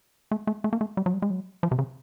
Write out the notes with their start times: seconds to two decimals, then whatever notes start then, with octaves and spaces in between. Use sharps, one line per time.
0.31 A3
0.47 A3
0.64 A3
0.73 A#3
0.81 A3
0.97 G3
1.06 F#3
1.13 G3
1.22 G#3
1.30 F#3
1.63 F3
1.71 C3
1.79 C#3